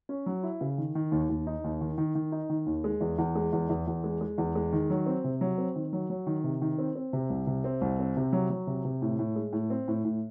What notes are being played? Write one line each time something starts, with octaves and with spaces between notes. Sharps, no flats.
C#4
F#3
E4
C#3
D#3
D#3
D#2
D#2
D#4
D#2
D#3
D#3
D#3
D#4
D#3
D#2
G#3
E2
E2
G#3
E2
E2
E2
G#3
G#3
E2
G#3
D#3
F#3
C4
C3
F#3
C4
D#3
F#3
F#3
D#3
C3
D#3
C4
C4
C3
C2
C3
C4
C2
C4
C3
F#3
F#3
C3
C3
A2
A2
G#3
A2
C4
A2
A2